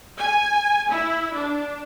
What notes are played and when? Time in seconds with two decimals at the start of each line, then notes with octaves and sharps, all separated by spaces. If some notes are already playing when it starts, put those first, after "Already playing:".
0.19 G#5
0.90 E4
1.33 D4